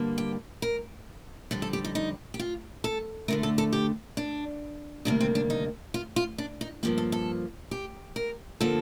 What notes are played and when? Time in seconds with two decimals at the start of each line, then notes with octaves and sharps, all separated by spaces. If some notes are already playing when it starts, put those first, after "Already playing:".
Already playing: G2 D3 G3 A#3
0.18 G4
0.62 A#4
1.51 F2 D3 G3
1.62 A4
1.73 G4
1.85 D#4
1.95 D#4
2.34 G4
2.39 F4
2.84 A4
3.28 D2 D3 A3 A#4
3.43 A4
3.58 A4
3.72 G4
4.17 D4
5.05 D2 C3 D#3 G3 A#3 D4
5.21 C4
5.35 D4
5.50 D#4
5.94 F4
6.16 F4
6.38 D4
6.61 D#4
6.83 G2 F3 A#3 G4
6.98 A4
7.12 A4
7.71 G4
8.16 A#4
8.60 D3 F3 A#3 A4